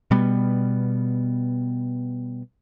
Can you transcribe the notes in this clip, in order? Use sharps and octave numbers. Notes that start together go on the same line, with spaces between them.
B2 G3 B3